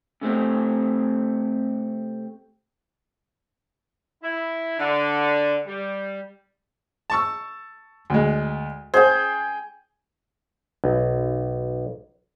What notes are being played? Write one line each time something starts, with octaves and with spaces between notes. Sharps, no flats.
C3 A3 C4
E4
D3
G3
A5 C#6 E6
D2 G#3
G#4 C5 G5
B1